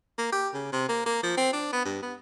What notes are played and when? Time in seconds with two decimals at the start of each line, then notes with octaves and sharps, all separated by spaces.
0.18 A#3
0.32 G4
0.54 C#3
0.72 C3
0.89 A#3
1.06 A#3
1.23 F3
1.37 C4
1.53 D4
1.73 B3
1.85 G2
2.02 B3